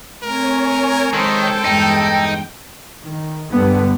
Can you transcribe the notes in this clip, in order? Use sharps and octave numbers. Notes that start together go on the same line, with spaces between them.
A3 C4 A#4 C#5 G#5
D#3 G#3 A4 C5 G5
E2 G2 G#3 D#4
D#3
G2 D3 G3 B3